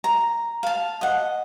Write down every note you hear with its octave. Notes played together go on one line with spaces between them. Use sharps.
A#5
F5 A5
D#5 F#5